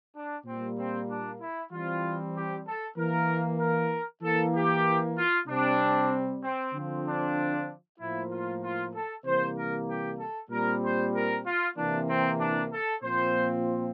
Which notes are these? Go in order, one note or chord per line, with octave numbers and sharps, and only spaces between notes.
D4
A#2 G3 A#3 C4
C4
D4
E4
E3 G3 C4 F4
G4
A4
E3 A#3 A#4
A#4
E3 A#3 A4
G4
F4
C3 G3 C4 D4
C4
D3 F3 C4
D4
A2 F3 A#3 E4
F4
F4
A4
C3 E3 G3 A#3 C5
A#4
G4
A4
A#2 G3 C4 A#4
C5
A#4
F4
C3 E3 A#3 D4
C4
D4
A4
A#2 F3 C4 C5